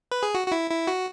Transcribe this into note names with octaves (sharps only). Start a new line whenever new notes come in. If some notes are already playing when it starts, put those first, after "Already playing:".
B4
G#4
F#4
F#4
E4
E4
F#4